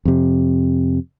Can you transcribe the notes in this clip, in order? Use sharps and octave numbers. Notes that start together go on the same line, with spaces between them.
F2 C3